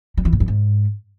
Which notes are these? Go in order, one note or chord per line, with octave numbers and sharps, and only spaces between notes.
G3
E3
A2
F#2
G#2